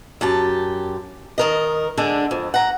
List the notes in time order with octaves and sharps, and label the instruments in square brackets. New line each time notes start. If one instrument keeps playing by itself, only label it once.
[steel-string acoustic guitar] F#2 G4 A5
D#3 A#4 D#5
D3 G#3 D4
F2
F#5 A#5